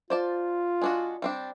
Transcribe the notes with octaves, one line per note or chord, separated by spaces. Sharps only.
F4 C5 D5 A5
G#3 D4 F#4
G3 C4 D4